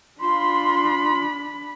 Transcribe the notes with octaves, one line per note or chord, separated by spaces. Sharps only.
D4 F4 B5 C6